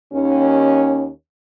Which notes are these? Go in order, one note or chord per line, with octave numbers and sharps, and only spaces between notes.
D#2 C#4